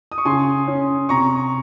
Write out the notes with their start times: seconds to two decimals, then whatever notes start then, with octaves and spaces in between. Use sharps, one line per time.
0.12 D#6
0.18 C#6
0.25 C#3 G#5 C6
0.68 C#4
1.09 C3 A#5 C#6